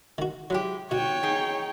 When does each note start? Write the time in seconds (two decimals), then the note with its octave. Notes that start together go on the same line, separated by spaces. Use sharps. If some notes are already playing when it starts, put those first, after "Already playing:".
0.18 D#3 F#4
0.50 F#3 G#3 E4 G4
0.91 B2 F#4 C#5 G5
1.23 D#4 G#4